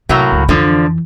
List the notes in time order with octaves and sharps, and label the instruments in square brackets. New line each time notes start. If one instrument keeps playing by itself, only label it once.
[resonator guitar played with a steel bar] A2 F#3 A#3 [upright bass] C3
[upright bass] C#2
[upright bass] F2 E3 [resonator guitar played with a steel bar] D3 F3